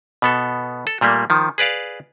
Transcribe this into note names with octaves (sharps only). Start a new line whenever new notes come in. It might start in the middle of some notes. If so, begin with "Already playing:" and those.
B2 B3 A4
A4
A#2 G3 A3 A#3
D#3 F3
G#4 B4 D5 F5